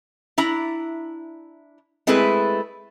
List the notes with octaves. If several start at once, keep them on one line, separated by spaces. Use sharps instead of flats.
D4 E4 A#5
G#3 A3 C4 E4 G#4 B4